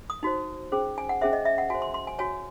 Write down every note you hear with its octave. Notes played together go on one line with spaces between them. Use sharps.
D#6
D#4 F#4 C5
C#4 G#4 C5
G#5
F#5
C#4 G#4 C5 E5
D#5
E5
F#5
F#4 C5 G#5
C6
C6
G#5
F#4 C#5 G#5